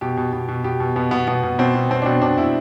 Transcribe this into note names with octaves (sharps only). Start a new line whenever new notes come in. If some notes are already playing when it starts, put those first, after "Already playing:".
B2 G4
B2
B2
B2
B2 G4
B2
B2 B3
B2 B3
B2 B3
B2
B2 C4
B2
B2 C4
D4
B2 C4
B2 D4
B2 E4